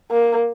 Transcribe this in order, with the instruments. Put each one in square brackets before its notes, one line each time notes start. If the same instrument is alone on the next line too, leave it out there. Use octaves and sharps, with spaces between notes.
[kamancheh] A#3